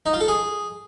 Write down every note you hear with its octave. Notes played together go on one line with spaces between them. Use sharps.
D#4
F4
A4
G#4